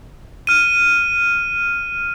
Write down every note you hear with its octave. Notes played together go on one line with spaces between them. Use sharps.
F6 D#7